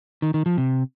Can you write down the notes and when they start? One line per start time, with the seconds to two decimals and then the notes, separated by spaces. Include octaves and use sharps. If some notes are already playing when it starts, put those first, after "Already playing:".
0.22 D#3
0.34 D#3
0.46 F3
0.58 C3